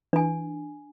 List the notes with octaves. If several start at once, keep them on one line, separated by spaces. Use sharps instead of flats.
E3 D4 G#5